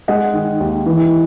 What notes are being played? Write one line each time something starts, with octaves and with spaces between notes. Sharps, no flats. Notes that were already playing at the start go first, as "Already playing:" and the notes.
G#3 D#5 F#5
D#3
D#2
E3